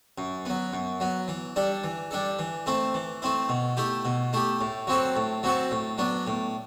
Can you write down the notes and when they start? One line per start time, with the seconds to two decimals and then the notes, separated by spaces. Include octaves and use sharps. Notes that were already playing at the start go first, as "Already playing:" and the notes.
0.18 F#2
0.46 F#3 B3
0.73 F#2
1.00 F#3 B3
1.28 E3
1.56 G3 D4 A4
1.84 E3
2.11 G3 D4 A4
2.39 E3
2.66 A3 C4 E4
2.94 E3
3.22 A3 C4 E4
3.49 B2
3.77 A3 E4 G4
4.05 B2
4.33 A3 E4 G4
4.61 A2
4.87 F#3 C4 F#4 A4
5.16 A2
5.43 F#3 C4 F#4 A4
5.71 A2
5.98 F#3 B3 D4
6.27 A2